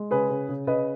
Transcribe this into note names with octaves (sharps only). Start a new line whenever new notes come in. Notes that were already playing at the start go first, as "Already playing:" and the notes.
Already playing: G#3
C#3 G#4 B4
C#3
C#3
C#3 B4 D#5